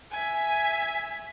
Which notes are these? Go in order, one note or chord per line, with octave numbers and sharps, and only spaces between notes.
E5 G#5